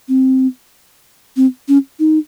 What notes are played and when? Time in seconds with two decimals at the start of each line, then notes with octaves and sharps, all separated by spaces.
0.08 C4
1.37 C4
1.68 C#4
1.99 D#4